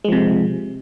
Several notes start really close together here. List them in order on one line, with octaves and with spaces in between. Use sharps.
G#3 F3 C3